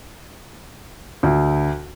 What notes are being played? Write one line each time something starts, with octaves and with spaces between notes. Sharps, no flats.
D2